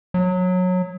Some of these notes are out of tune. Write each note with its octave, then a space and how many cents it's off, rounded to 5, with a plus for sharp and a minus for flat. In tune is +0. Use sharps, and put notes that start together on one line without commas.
F#3 -20